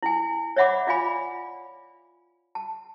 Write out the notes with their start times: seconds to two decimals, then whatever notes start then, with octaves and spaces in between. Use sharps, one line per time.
0.03 E4 G#5
0.56 C#5 D5 E5 F#5 B5 D6
0.87 F4 D5 F5 G#5 B5
2.55 A5